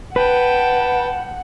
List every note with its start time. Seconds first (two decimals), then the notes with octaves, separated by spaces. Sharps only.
0.16 B4 F#5 G5 A5